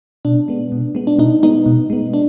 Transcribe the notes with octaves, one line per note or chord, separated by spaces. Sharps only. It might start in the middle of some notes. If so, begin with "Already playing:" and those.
B2 D4
G#3 B3
B2
G#3 B3
D4
B2 D#4
G#3 B3 D#4
B2
G#3 B3
D4